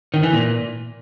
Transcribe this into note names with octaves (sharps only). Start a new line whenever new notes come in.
D#3
E3
A#2